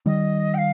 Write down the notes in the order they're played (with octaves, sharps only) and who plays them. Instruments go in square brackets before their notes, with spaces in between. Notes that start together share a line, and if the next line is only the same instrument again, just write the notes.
[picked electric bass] D#3 G3 [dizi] D#5
[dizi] G5
F5